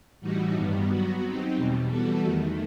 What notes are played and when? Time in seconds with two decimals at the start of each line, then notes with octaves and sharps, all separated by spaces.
0.21 A2 E3 G3 D#4 F#4
0.55 G2 D#3 G3 B3
0.89 F#3 B3 F#4
1.23 F#3 C4 D#4 G4
1.56 E2 B2 G3
1.89 E3 G3 B3 F#4 A4
2.23 E2 D#3 A3